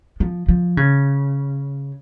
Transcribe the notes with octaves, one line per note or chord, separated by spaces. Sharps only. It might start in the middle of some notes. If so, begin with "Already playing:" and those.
F3
F3
C#3